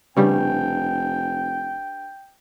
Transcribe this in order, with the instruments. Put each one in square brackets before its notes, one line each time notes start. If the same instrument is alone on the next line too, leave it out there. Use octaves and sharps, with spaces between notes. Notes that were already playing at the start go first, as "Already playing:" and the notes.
[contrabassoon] F1 [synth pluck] C#3 G3 [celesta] D4 G4 B4 [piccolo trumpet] G5